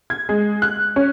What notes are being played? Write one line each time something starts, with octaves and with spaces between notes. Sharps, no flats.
G#6
G#3
F#6
C#4